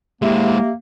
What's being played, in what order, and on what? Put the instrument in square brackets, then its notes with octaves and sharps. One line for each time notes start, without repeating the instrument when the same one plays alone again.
[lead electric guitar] G#3 E4 [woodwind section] A#3 [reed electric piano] G4 E5